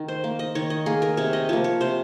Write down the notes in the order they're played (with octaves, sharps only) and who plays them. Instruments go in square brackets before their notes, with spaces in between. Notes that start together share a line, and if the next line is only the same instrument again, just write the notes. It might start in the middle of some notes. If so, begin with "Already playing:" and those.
Already playing: [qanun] D#3
C5
A#3
D#5
D#3 C#5
D#5
A#3 G#4
A#4
C3 C#5
D#5
F3 A#3 C#5
C#5
C3 C5